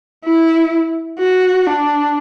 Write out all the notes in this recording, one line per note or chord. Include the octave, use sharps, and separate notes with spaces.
E4
F#4
D4